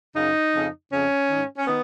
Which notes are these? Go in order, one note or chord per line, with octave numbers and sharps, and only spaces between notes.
F#2 C#3 D#4
F2 C#3
F2 C#3 C#4
G#2 D#3
C#4
D#3 B3